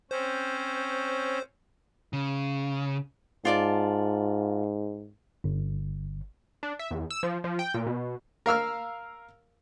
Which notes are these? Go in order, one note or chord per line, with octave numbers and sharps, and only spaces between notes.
C4 C#4 C5
C#3
G#2 F4 D5 A5
G1
D4
E5
E2
E6
F3
F3
G5
A#2
B2
A#4 F5 E6 F6